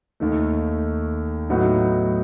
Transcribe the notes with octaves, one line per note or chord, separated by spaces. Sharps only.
D#2 D#3 A3
A2 F#3 B3 D#4 F#4